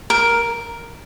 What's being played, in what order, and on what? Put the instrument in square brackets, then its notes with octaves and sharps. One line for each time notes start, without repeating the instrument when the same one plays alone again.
[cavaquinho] A#4